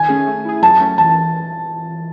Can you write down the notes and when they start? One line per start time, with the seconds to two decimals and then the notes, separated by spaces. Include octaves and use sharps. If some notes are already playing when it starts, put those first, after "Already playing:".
Already playing: D#3 G#5
0.08 A3 C#4 G#4
0.27 A3
0.45 E4 G#4
0.62 F#3 A5
0.80 A3 C#4
0.98 E3 A5